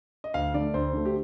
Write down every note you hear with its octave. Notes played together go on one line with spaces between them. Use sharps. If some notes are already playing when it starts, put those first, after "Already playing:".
D#5
D2 F5
D3 A3 D5
D2 C5
D3 A3
G4